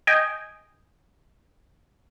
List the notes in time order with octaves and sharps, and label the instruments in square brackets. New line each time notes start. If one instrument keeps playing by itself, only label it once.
[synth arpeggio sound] D#5 G5 G#5